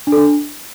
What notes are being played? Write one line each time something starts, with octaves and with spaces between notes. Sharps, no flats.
D4
A4
D4